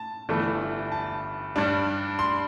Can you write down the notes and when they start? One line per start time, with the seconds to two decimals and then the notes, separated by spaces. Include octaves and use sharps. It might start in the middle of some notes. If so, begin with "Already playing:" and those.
Already playing: A5
0.29 G1 G2 E3 A3
0.92 A5
1.56 G2 G3 D4
2.19 C6